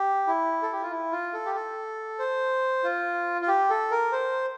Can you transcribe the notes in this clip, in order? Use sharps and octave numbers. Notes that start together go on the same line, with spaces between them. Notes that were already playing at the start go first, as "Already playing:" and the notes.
Already playing: G4
E4
A4
G4
F4
E4
F4
A4
G4
A4
C5
F4
F4
G4
A4
A#4
C5